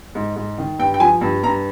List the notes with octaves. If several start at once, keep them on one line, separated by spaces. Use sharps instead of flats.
G#2
G#2
D#3
G2 G5
G5
F3 G#5
G2
G2 A#5